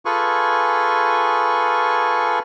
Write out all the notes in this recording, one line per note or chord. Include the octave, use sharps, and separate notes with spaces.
F4 G#4 A4 B4 G#5 C#6